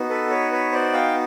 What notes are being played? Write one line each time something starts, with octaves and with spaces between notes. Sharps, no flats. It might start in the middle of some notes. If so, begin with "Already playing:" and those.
Already playing: B3 D#4 F#4
A4 B4
B4 C#5
B4 C#5
C5 D5
F5 G5